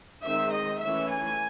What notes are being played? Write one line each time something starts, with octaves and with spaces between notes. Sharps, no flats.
D#3 G#3 C4 E5
D#5
E3 A3 C#4 E5
G#5